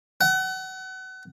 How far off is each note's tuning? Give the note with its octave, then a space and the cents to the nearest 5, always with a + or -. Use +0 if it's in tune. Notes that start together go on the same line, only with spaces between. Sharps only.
F#5 +30